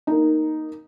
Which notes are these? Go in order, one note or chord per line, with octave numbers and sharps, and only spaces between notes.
A#3 D#4